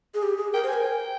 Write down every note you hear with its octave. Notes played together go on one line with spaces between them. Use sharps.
G#4
G4
G#4
A#4 G5
C5
G#5
A#4
G5